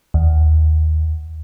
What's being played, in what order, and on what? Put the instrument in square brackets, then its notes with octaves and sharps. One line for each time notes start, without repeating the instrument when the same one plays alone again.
[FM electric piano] D#2